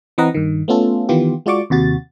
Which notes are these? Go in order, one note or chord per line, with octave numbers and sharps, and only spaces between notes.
E3 C4 B4 D#5 F#5 A#5
G2 D#3
A3 B3 C#4 F4 A4
D#3 E3 B3 F4 G4
G#3 F4 F#4 D5 C#6 D6
D#2 C3 F#4 A6